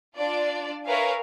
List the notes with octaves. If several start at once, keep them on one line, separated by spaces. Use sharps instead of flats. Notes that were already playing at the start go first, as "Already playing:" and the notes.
D4 F4 D5
A#4 B4 C#5 E5 F5 G#5